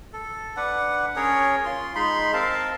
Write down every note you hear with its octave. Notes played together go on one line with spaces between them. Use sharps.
A4
D4 B4 F#5
C#4 G#4 A#4 C#5
F4 C6
G#3 D#4 B5 C6
C4 A#4 F5 A5